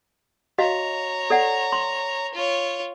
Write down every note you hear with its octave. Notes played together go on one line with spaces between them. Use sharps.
F#4 C#5 D#5 F5 A#5
A4 D5 F#5
C6
F4 C#5